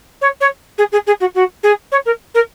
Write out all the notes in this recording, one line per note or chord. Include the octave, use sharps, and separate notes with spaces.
C#5
C#5
G#4
G#4
G#4
F#4
F#4
G#4
C#5
A#4
A#4